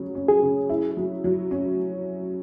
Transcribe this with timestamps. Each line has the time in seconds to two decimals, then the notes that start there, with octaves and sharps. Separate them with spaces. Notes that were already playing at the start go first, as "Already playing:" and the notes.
Already playing: C#3 F#3 C#4
0.15 C#4
0.28 G#4
0.43 C#3
0.69 E4
0.97 F#3
1.24 F#3
1.51 C#4